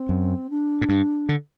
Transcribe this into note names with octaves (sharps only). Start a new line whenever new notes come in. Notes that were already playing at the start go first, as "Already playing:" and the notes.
Already playing: C4
F#2
D4
A2
G2
D3